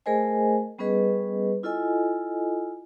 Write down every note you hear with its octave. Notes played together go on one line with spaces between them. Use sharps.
A3 G#4 A#4 C5 D#5 G#5
G3 B3 C#4 G#4 B4 D#5
E4 F4 A4 D#5 G#5